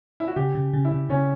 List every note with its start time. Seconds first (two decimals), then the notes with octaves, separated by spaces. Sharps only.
0.20 E4
0.28 F#4
0.36 C#3 G4
0.55 C#3
0.73 C#3
0.85 E4
0.91 C#3
1.09 C#3 C#4